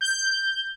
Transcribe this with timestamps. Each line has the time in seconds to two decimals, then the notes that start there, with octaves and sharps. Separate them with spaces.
0.01 G6